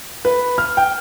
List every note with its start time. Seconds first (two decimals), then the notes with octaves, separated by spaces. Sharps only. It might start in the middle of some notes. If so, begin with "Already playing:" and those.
0.25 B4
0.58 F6
0.77 G5